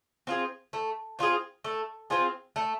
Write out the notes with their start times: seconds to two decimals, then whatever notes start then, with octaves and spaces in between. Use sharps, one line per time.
0.27 C4 F4 G#4
0.73 A3
1.19 C4 F4 G#4
1.64 A3
2.10 C4 F4 G#4
2.56 A3